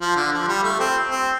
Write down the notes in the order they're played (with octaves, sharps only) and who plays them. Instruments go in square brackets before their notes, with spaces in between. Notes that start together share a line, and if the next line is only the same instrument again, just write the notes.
[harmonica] F3
D3
F3
G3
A3
C4
C4